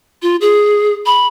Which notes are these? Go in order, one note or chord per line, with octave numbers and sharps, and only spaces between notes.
F4
G#4
B5